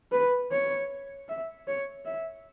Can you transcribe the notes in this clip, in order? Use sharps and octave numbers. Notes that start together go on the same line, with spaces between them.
B4
C#5
E5
C#5
E5